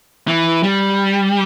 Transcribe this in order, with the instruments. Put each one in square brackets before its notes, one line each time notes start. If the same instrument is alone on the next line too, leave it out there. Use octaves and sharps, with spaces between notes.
[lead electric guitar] E3
G3